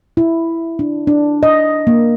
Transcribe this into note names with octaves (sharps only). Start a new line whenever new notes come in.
E4
D4
D4
D#5
A#3